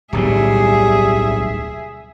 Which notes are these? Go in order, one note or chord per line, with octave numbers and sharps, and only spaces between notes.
D1 B1 A2 G3 G#4 E5